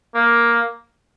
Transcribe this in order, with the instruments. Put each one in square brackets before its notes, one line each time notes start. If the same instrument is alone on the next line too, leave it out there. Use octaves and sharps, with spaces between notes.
[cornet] A#3